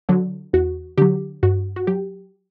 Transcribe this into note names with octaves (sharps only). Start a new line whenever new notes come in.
D3 F#3
E2 F#4
D3 F#3 G4
G2 F#4
F#4
F#3 G4